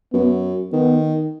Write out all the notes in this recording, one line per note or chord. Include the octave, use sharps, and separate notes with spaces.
F#2 B3
D#3 B3